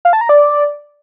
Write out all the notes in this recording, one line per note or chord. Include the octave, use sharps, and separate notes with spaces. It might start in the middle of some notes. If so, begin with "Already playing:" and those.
F5
A5
A#5
D5